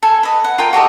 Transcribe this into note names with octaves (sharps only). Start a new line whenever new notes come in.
A4 G#5
B4 D#5
F#5
F4 A#4 G5
F#4 G4 A4 D#5